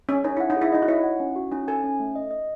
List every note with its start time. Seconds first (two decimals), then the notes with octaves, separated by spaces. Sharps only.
0.09 C#4 G#5
0.24 D#4 C#5
0.37 E4 F#5
0.50 D#4
0.56 G#4
0.62 E4
0.72 D#4 D#5
0.82 F#4
0.88 E4 C#5
1.04 F#5
1.20 C#4
1.36 F#4
1.52 C#4 D#4
1.68 A4 G#5
1.84 C#4
2.00 A3
2.15 D#5
2.31 D#5